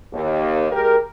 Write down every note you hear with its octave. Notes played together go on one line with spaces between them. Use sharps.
D#2
G#3 G4 A#4